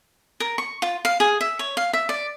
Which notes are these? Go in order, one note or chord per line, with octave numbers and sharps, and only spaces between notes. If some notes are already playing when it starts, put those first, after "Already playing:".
A#4
C#6
F4
F5
G#4
E5
C#5
F5
E5
D5